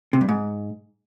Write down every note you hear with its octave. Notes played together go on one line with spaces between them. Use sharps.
C3
G2
G#2